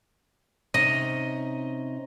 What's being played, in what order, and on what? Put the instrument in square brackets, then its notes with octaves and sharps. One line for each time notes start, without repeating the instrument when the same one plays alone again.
[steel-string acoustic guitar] C3 C#4 D#4 [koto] D#5